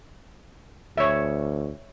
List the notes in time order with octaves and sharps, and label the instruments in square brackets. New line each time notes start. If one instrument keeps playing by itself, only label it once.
[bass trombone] D2 [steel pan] C#5 E5